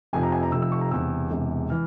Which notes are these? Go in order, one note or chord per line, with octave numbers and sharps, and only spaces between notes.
F1 F2 C3 F3 G#5
A#5
G#5
A#5
F1 F2 C3 F3 E6
E6
C#6
A#5
E1 E2 C3 E6
E1 E2 C3
E3 F6